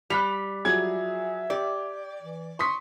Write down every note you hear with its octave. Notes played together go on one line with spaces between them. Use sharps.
G3 F#6 B6 F7
F3 F#3 G#4 E5 G#6
G4 D5
E3
C6 C#6 D#6 B6